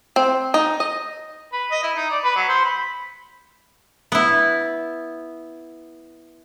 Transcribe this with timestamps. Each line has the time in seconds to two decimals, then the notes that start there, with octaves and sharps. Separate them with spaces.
0.16 C4
0.54 D#4
0.80 D#5
1.53 B4
1.71 D#5
1.83 E4
1.96 D#4
2.11 D5
2.24 B4
2.36 F#3
2.49 C5
2.65 B5
4.12 B3 E4